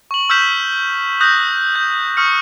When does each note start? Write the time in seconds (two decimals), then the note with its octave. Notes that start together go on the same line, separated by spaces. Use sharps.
0.11 C#6 F#7
0.29 C#6 E6 F6 G6 B6 E7
1.20 D#6 F#6 G6 A#6
1.75 G6
2.17 C#6 D#6 F6 C#7